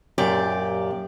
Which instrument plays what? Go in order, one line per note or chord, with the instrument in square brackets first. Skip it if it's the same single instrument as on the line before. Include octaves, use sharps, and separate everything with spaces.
[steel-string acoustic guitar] F#2 A#2 G4 D5